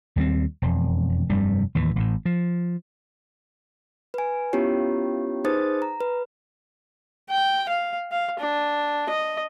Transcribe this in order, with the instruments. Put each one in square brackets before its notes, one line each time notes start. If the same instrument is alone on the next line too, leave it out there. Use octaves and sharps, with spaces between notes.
[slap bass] D#2 G3 G#3 C4
E1 F2
F1 G2 C3 G3
D#2 A2 E3
A1 A2
F3
[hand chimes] B4 G#5
B3 C#4 E4 F4 G4 C#5
D#4 G#4 B4 C5 D#6 A6
A#5
B4
[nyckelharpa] G5
F5
F5
D4
D#5